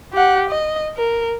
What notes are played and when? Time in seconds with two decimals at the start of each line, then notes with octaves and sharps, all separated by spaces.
0.14 G4 F#5
0.50 D#5
0.97 A#4